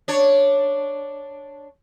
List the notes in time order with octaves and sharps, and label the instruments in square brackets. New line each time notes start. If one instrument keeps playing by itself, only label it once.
[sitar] D4 C#5